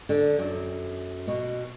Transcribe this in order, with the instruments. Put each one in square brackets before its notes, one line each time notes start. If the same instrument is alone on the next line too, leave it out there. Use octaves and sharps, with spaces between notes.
[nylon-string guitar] D3
F#2
B2